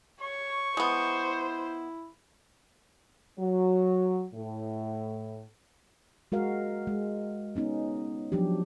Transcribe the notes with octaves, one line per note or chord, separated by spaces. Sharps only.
C#5 C#6
G#3 B3 E4 C5
F#3
A2
G#3 F#4 A#4 F5
G#3
B3 C#4 D#4
F3 F#3 D4 G4